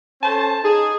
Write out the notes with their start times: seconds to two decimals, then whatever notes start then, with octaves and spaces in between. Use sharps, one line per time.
0.22 C#4 A4 C5 A5
0.64 D#4 G#4